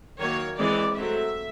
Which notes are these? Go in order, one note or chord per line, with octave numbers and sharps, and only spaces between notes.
D#3 F#3 A#3 C#5
E3 G#3 C4 D5
F#3 A3 C4 E5